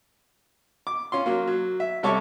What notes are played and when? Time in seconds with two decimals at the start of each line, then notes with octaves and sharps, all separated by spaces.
0.87 D6
1.12 C#4 F4 C6
1.26 F#3 A#3
1.47 F#3
1.80 E5
2.03 C3 G3 A4 C#5 C#6 D6